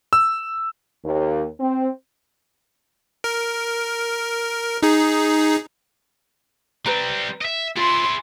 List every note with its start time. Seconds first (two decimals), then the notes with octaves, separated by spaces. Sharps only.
0.13 E6
1.05 D#2
1.60 C4
3.24 A#4
4.83 D#4 G#4
6.86 G3 C4 B4 A#5
7.41 D#5 E5
7.76 E4 F4 G#4 C6